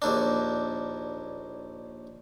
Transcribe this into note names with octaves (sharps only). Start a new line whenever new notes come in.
A#1 D#2 D4